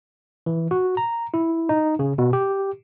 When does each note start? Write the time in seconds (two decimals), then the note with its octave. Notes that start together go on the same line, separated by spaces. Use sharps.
0.46 E3
0.71 F#4
0.97 A#5
1.34 E4
1.69 D#4
1.99 C#3
2.18 B2
2.33 G4